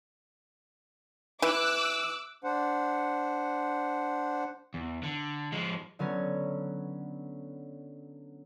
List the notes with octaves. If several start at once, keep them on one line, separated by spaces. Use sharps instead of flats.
E3 D6 E6 F#6
D4 C5 F#5
E2
D3
F3 G#3
D3 F#3 B3 C#4